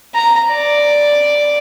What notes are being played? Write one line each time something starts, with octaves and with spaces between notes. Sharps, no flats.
A#5
D5